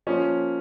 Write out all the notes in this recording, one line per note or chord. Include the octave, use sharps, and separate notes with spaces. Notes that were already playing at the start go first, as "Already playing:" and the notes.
F3 A#3 C#4